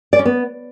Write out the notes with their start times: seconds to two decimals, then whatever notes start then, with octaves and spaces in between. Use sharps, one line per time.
0.13 D5
0.19 C#4
0.26 B3